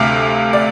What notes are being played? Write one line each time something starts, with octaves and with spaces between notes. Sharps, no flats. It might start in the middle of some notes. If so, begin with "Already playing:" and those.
Already playing: D2 C3 A3 F5
D5